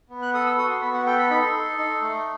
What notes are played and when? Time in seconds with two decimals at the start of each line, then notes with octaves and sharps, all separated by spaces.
0.09 B3
0.22 F#6
0.34 A4 D#6
0.46 E6
0.58 F#4 D#6
0.70 C6
0.81 B3 B5
0.93 F#5
1.06 A4 G5
1.18 B5
1.30 D#4 B5
1.42 C6
1.54 A4
1.78 D#4
2.02 A3